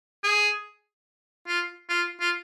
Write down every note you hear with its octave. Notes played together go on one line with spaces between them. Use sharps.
G#4
F4
F4
F4